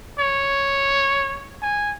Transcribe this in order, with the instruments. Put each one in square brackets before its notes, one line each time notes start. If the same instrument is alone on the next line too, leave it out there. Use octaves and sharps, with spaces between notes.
[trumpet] C#5
G#5